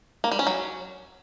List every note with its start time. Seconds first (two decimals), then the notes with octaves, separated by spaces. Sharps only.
0.24 A#3
0.31 G3
0.39 C#4
0.47 F#3